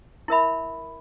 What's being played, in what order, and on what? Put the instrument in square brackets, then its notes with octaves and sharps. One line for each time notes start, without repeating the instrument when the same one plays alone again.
[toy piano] E4 A#4 E5 B5